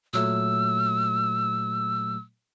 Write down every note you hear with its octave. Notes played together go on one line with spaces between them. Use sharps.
A#2 F#3 A3 E6